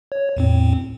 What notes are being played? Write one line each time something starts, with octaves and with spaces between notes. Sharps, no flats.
C#5
E2 A2 C4